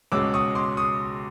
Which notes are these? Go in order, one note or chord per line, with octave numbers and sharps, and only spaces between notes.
C#2 B2 G#3 C#4 D6 E6
C#6 D#6
C6 D6
C#6 D#6